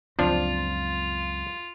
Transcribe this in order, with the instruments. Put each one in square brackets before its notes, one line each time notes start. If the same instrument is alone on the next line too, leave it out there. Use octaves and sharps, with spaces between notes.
[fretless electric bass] C#2 F#2 C4 [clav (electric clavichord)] F3 D4 [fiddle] F4